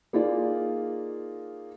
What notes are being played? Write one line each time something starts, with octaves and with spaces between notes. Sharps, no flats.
A#3 D#4 F4 G#4 D5